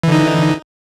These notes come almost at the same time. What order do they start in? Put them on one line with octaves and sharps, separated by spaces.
E3 D3 D#4